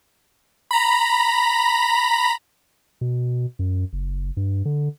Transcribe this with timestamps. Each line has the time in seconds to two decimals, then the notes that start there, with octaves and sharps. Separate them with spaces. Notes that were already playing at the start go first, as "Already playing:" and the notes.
0.71 A#5 B5
3.01 B2
3.59 F#2
3.93 F#1
4.37 G2
4.65 D3